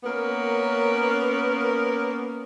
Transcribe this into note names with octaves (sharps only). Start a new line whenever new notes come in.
A#3 B3 C#4 A#4